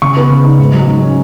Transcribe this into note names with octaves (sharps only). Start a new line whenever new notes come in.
C#3 C#6
B3
C#3
D#4
G#2
F#3
G#2
C#4